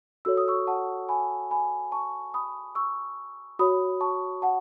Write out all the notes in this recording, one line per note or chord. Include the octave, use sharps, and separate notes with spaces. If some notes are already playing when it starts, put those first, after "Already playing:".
F#4 A4 C#5 E6
D#6
C#6 E6
F#5 A5
G#5 B5
G#5 B5
A5 C#6
B5 D#6
C#6 E6
F#4 C#5 B5 D#6
A5 C#6
F#5 A5